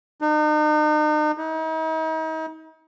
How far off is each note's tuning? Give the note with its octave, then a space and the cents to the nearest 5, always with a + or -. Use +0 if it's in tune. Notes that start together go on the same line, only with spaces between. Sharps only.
D#4 -40
D#4 +40